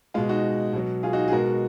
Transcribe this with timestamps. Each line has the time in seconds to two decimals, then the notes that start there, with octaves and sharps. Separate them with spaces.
0.14 B2 G#3 F4
0.29 D#4 F#4
0.73 B2 F#3
1.03 F4 G#4
1.13 D#4 F#4
1.28 G#4
1.32 B2 G#3 F#4 A#4